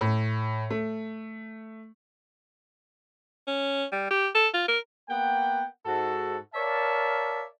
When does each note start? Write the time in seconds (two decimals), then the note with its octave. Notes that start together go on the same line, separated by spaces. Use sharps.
0.01 A2
0.71 A3
3.48 C#4
3.92 G3
4.11 G4
4.35 A4
4.54 F4
4.68 A#4
5.09 A#3 B3 F#5 G5
5.86 G#2 F#4 A4
6.54 A#4 C#5 D5 E5 F5 A5